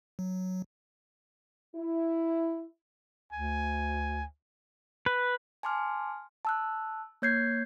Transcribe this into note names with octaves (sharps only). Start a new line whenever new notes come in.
F#3
E4
D2 G#5
B4
G#5 A5 C6 D6 F6
A5 E6 F#6
A#3 C#5 G6 G#6 C7